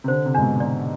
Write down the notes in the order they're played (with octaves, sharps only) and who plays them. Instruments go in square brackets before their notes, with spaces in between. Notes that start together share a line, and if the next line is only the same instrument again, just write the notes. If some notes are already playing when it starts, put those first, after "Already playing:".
[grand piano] C3
[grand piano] D3 [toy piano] C5
[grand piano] C3
[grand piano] G#2 [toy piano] D4
[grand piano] B2
[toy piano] D5